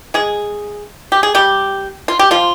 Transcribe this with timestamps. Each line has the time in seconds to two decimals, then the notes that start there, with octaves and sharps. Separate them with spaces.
0.14 G#3 G#4
1.12 G4
1.23 G#4
1.35 G3 G4
2.08 F4
2.19 G4
2.31 F3 F4